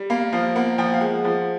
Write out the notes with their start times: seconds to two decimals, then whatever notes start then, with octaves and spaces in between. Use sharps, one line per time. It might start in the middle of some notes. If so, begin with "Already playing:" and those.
Already playing: G3
0.10 A#3 F5
0.33 F3 F5
0.55 A#3 F#5
0.78 F3 G5
0.86 F#5
0.93 F5
1.01 G#3 F#5
1.24 F3